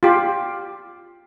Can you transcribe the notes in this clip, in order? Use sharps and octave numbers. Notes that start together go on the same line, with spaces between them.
F4 G4